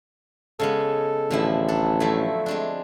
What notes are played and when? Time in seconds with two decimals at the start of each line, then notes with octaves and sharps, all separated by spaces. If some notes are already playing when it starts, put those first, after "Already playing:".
0.60 C#3 G#3 B3 A4
1.31 A1 D3 F3 E4
1.68 D4 A4
2.00 F3 F#3 A3 E4
2.46 G#3 C4 D4